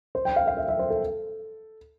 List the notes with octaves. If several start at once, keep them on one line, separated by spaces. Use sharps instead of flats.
C5
G5
F5
F5
E5
E5
C5
A4